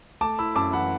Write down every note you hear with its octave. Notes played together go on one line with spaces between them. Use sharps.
A3 A5 D6
E4 B5 E6
F#2 A5 D6
E3 F#5 B5